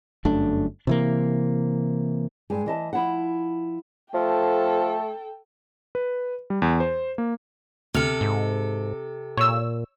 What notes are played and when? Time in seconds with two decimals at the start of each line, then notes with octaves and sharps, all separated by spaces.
0.25 G1 F#2 A3 D4
0.87 C3 E3 A#3
2.50 G2 G#3 G#5
2.66 E3 D#5 A5
2.93 F3 E4 F#5
4.14 F3 A3 A4 G5
5.95 B4
6.50 G3
6.62 E2
6.80 C5
7.18 A#3
7.94 D2 C3 A4 F6
8.21 G#2
9.37 A#2 C#5 E6